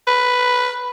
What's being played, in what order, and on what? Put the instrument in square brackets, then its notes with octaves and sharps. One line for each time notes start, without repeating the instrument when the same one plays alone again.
[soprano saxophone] B4